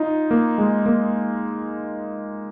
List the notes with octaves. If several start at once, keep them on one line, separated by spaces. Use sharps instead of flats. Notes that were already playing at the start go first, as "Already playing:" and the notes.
Already playing: D#4 F4
A#3
G#3
A#3